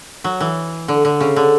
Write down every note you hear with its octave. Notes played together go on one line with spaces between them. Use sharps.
F#3
E3
D3
D3
C#3
D3